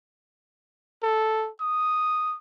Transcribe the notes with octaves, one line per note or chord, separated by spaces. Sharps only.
A4
D#6